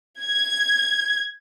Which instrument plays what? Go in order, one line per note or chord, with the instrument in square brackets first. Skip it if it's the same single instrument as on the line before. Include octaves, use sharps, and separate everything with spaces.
[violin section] G#6